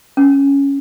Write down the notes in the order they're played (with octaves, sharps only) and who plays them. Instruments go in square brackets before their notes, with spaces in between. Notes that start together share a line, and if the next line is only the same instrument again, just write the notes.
[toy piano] C#4